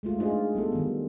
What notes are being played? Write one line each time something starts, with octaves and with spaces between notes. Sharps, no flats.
G#3 A3 F4
D4 D#4 F4 G#4 C5 D#5
G3 B3 A4
D#3 G3